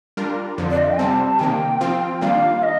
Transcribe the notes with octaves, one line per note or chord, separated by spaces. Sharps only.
G3 D4 F4 A#4
F2 D3 F3
D5
D#5
F5
G5
C3 G3 C4 A5
C3 D#3 A#3 G5
F3 C4 F4
D#3 G3 A#3 D4 F4 F5
D#5